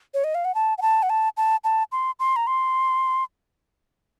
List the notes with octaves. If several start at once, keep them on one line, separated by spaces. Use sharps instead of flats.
C#5
D#5
F5
F#5
A5
F#5
A5
F#5
A5
A5
A5
C6
C6
A#5
C6